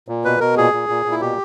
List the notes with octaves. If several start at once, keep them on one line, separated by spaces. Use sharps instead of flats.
A#2
B2 B4
B2 A#4
A#2 G#4
A#2
A#2
A#2
E4
B2 G4